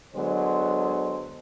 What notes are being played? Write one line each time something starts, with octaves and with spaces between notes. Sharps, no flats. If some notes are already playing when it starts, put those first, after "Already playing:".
D3 F#3 G#3 B3 C5